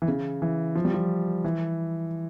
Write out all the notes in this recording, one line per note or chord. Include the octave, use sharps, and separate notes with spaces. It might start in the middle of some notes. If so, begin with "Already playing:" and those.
E3
C#3
E3
F3
G3
F3
E3